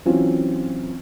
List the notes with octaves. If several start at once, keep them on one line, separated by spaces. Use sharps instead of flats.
E3 F#3 C4 C#4 F4